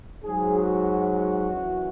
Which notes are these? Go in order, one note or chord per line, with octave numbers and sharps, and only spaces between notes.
G#2 F#3 G#4
F#4
F#2 E3